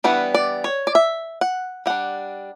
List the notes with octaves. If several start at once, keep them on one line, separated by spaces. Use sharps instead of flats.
E3 G3 B3 D4 F#5
D5
C#5
D5
E5
F#5
G3 D4 F#5